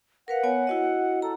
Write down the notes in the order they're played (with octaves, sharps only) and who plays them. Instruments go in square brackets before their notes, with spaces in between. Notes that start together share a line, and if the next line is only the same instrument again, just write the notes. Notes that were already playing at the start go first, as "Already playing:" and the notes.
[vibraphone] A#4 B4 F5 [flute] F#5
[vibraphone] B3 C#5 G#5
E4 F#4 D#5
[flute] A4 [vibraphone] A#5